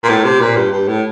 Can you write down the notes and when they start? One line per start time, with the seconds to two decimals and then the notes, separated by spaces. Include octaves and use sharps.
0.03 A#2
0.09 A2
0.25 C3
0.41 A#2
0.57 G2
0.72 G2
0.88 A2